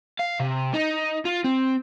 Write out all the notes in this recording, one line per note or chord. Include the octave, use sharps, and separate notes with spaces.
F5
C3
D#4
F4
C4